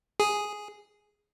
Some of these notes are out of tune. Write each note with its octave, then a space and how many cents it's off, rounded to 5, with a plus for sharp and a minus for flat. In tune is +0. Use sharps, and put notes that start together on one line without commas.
G#4 +0 G#5 +0